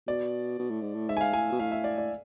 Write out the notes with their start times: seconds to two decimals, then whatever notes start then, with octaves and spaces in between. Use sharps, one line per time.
0.08 B2 D5
0.59 B2
0.70 A2
0.82 G#2
0.94 A2
1.09 G#2 E5
1.17 G#5
1.21 F5
1.33 A2 G#5
1.52 B2
1.59 A2 F5
1.72 E5
1.84 D5
1.98 D5